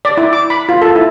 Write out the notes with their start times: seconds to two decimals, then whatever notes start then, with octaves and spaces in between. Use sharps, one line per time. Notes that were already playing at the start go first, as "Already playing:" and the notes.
0.05 D5
0.17 E4
0.33 D6
0.50 B5
0.69 F4
0.82 A4
0.96 E4